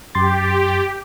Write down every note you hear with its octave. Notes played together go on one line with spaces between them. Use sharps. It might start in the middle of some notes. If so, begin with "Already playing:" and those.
F#2 G4 C6 A6